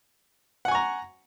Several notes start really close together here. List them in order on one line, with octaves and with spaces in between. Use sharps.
F#5 G#5 C#6 A#5